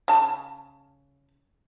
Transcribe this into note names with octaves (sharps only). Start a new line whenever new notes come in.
C#3 A5